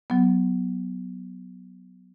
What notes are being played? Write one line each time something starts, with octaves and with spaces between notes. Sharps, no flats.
F#3 B3